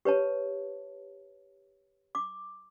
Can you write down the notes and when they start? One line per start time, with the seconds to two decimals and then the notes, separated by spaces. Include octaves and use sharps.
0.05 G4 B4 C#5 A5
2.15 D6